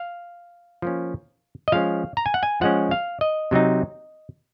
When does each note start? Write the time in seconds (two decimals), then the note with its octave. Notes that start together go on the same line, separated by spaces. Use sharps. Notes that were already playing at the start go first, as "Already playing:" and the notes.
Already playing: F5
0.82 F3 A#3 C#4
1.68 D#5
1.72 F3 G#3 C#4 F5
2.17 A#5
2.26 G#5
2.34 F#5
2.43 G#5
2.61 F3 G#3 C#4 F#5
2.91 F5
3.21 D#5
3.51 C3 F#3 C4 D#4